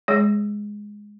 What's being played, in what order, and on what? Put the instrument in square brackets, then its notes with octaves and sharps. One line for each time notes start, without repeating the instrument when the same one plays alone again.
[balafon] G#3 G#4 C#5